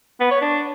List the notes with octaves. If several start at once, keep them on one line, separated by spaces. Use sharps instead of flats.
B3
C#5
D4